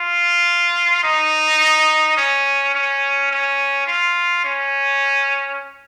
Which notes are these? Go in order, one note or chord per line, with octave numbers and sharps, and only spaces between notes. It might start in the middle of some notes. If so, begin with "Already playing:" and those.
Already playing: F4
D#4
C#4
C#4
C#4
F4
C#4